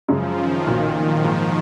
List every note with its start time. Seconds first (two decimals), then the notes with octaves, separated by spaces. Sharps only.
0.08 F#2 C#3 F3 G#3 C#4
0.37 D#3
0.66 B1 A#2 F#3
0.95 F3
1.24 G#2 D#3 A#3